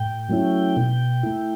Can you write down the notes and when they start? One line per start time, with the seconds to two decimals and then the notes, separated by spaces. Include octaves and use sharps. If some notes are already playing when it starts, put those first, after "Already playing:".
Already playing: A2 G5
0.29 F#3 A3 C#4 E4
0.77 B2
1.23 A3 E4